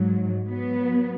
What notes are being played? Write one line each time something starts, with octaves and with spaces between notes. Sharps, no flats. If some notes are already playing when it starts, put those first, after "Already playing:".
Already playing: G#2 F#3
F#3 B3